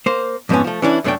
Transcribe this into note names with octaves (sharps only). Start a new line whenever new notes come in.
A#3 C5
F2 G#2 F3 A3 B3 C#4
F3 A3
E3 C#4 D4 E4
F#2 A3 D4 C#5 D5 G5